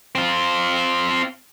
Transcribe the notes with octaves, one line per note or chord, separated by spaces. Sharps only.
C4 F4